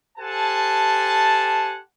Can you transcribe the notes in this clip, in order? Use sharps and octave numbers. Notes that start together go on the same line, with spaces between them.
G4 A4 C5 F#5 G#5 A5